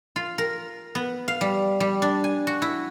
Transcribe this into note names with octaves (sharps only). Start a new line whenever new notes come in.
F4
A#4
B3
F5
G3
G3
D4
G#5
F#4
E4